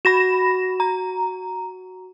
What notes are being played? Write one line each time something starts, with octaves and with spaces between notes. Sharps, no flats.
F#4 B5 A#6 E7
A#5